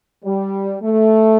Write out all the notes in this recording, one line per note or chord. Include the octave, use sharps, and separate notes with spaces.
G3
A3